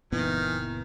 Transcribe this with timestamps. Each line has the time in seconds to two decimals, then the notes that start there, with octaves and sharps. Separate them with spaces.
0.12 F#1 A#2 D#3 E3 B3